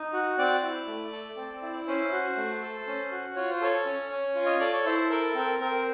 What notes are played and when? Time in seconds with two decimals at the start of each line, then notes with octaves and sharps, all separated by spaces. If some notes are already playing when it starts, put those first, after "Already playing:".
Already playing: D#4
0.13 F#4
0.38 C4 D5
0.63 E4
0.87 A3
1.12 A4
1.37 C4
1.62 E4
1.88 C#4 C5
2.12 F#4
2.37 A3
2.62 A4
2.87 C#4
3.11 F#4
3.36 F4 C#5
3.50 C5
3.61 A4 C#5
3.86 C#4
4.11 C#4
4.35 F4
4.46 D#5
4.59 A4 D5
4.72 C#5
4.85 E4 C5
5.10 A4 A#4
5.35 C4 A#4
5.60 C4 A#4